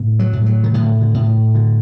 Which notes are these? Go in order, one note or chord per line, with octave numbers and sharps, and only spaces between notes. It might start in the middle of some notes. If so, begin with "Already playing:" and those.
Already playing: A2
F#3
A2
F#3
D#3
A2 D3
D3
A2
D3